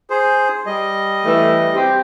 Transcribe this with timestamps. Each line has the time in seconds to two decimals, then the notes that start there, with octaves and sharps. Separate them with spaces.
0.10 G#4 C5
0.66 G3 D#5
1.25 E3 A3
1.75 C4 G4